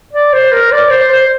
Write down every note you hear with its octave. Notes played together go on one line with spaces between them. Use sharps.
D5
C5
A#4
D5
C5
C5